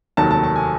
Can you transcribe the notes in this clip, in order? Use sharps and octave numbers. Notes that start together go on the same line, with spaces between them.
F1 D#2 D#3 F#3 A5
A5
A5
G#5